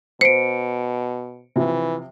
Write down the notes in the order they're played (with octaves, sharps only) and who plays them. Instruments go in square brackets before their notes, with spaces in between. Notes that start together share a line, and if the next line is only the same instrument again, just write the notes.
[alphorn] B2 [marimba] C5 [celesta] C#7 D7
[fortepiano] C3 F3 [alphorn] E3